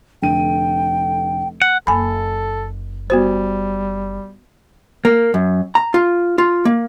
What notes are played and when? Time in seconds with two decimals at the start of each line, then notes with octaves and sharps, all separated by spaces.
0.22 F1 D3 G5 D#7
1.62 F#5
1.87 F#1 A4 G#5 B5
3.10 G3 B3 F#4 C5
5.05 A#3
5.34 F#2
5.75 A#5
5.94 F4
6.38 F4
6.65 A#3